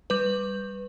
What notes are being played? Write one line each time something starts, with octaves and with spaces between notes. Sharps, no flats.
G3 B4